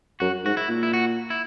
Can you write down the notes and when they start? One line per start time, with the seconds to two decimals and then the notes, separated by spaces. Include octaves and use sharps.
0.20 F#2 F#4
0.45 G#2 F#4
0.57 E4
0.69 A#2
0.83 E4
0.93 F#4
1.30 E4